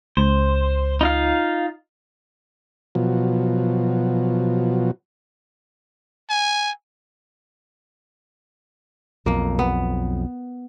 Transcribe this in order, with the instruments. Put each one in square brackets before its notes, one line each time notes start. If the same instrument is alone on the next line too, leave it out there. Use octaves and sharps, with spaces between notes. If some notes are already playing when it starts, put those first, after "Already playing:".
[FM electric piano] C#2 [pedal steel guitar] C5
[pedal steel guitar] D#4 F4 F5
[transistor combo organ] B2 F3 F#3
[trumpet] G#5
[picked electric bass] B1 F2 [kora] A#3
[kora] B3